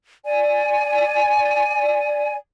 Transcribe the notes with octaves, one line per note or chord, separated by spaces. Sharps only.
D5 G#5